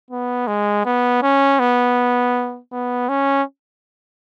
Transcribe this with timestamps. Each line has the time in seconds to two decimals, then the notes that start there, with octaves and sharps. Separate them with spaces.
0.11 B3
0.48 G#3
0.85 B3
1.22 C#4
1.60 B3
2.72 B3
3.09 C#4